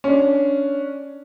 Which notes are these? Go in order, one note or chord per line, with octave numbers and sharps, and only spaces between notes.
C#4 D4